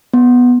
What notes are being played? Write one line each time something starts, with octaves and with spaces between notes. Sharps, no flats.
B3